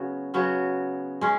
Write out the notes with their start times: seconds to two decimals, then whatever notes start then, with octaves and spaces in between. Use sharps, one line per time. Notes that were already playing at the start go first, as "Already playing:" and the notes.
Already playing: C#3 F#3 B3 F#4
0.34 C#3 F#3 B3 F#4
1.21 G#3 C#4